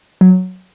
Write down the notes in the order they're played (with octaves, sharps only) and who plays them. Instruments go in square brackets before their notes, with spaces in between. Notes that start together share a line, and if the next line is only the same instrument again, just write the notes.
[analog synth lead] F#3